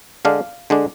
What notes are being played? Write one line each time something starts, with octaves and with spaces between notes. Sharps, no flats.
D3 G#3 D4 F5
D3 G#3 D4